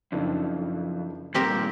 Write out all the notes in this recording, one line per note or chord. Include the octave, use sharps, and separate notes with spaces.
F#1 F2 D4 D#4
G2 A#2 C4 G4 A#4